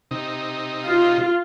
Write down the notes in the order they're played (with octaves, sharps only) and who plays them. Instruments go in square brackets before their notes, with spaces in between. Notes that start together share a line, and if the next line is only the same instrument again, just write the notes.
[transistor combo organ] C3 D#4
[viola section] F4